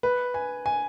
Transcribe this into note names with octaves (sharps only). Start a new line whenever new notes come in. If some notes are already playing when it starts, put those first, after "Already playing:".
B4
G#5
G#5